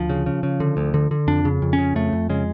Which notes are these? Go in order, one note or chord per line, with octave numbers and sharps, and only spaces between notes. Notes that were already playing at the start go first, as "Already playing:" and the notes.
Already playing: D2 F3
C#3
C#3
C#3
D3
D2
D3
D3
F2 D4
C#3
F2
C#4
C#3
F2 A3
F2
C#3 G#3